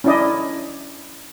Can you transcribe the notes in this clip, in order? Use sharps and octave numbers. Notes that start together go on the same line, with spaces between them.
C#4 D4 E4 D5 D#5